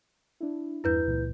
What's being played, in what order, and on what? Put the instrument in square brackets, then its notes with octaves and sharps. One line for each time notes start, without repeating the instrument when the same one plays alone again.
[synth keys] D4 E4
[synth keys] E2 G2 [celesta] E4 B4 G6
[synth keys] C#2 A#2 E3